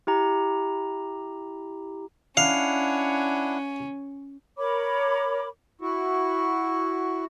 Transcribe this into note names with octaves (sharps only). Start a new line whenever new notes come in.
E4 G4 A#5
C#4 D4 E4 F5 F#5
A#4 C#5 B5 D6
E4 F#4